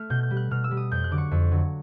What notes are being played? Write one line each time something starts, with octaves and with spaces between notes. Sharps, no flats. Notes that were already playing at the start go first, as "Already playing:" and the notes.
Already playing: A3 F6
B2 G6
G6
G3
F#6
B2 F6
E6
G3
D#6
F2 G6
F#6
D3 F#3 D6
C#6
F2
D3 F#3